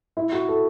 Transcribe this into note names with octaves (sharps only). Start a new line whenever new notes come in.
E4
F#4
A4